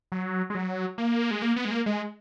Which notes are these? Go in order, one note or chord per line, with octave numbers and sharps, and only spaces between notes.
F#3
G#3
F#3
A#3
G#3
A#3
B3
G#3
A#3
G#3